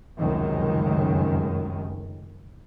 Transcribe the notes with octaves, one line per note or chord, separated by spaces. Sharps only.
F1 C#2 F#2 D#3